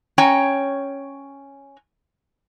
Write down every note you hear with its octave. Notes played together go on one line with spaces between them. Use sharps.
C#4 C#5 G5 A#5